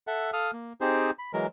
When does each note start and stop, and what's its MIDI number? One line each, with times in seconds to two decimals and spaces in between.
0.07 0.31 69
0.07 0.31 76
0.07 0.31 78
0.33 0.51 69
0.33 0.51 77
0.33 0.51 87
0.33 0.51 89
0.53 0.73 58
0.81 1.11 60
0.81 1.11 63
0.81 1.11 67
0.81 1.11 68
0.81 1.11 72
1.19 1.32 83
1.33 1.47 52
1.33 1.47 54
1.33 1.47 56
1.33 1.47 70